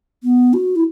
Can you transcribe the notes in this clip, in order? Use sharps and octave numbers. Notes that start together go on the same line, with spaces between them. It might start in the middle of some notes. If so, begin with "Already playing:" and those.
B3
F#4
E4